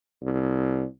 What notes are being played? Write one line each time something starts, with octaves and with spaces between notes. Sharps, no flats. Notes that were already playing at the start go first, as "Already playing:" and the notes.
C2